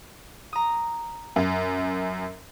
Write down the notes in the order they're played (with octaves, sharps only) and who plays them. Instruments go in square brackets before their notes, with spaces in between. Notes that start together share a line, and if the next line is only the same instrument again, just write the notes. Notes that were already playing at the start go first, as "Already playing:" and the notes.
[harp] A#5 D#6
[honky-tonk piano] F#2